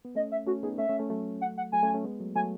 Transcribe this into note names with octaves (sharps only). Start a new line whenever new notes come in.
B3
A3 C#4 D#5
E5
A3 C#4 F#4
B3 D#4 G#4
A3 C#4 E5
A3 C#4
A3 C#4
F#3 A3
F#5
F#5
F#3 A3 G#5
A3 C#4
A3 C#4
G#3 B3
F#3 A3
F#3 A3 G#5